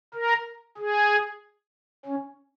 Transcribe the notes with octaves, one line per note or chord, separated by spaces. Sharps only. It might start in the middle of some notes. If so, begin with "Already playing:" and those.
A#4
G#4
C#4